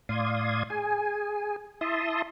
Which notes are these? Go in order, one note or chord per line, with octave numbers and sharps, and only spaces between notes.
A2 D5 F5 C6 D#6 G#6
G#4 G#5
E4 E5 A5 C6 D#6